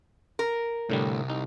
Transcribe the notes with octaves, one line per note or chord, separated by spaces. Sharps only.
A#4
C2 A2 D3 G3
D#4